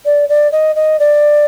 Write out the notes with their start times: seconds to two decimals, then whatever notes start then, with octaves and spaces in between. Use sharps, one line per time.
0.05 D5
0.29 D5
0.52 D#5
0.75 D#5
0.99 D5